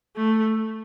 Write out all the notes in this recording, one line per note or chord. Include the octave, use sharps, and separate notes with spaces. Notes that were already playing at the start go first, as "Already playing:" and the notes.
A3